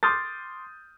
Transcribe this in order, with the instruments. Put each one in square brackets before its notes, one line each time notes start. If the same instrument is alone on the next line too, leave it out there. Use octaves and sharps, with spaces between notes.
[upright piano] C6 D6 D#6 F6 G6 A6